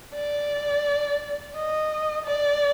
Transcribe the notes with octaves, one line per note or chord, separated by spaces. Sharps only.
D5
D#5
D5